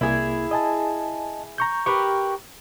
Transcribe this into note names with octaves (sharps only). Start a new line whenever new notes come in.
C2 A#3 E4 G#4 G#6
D#5 G#5 A5
A#5 C#6 G6
G4 A#4 B4 C#6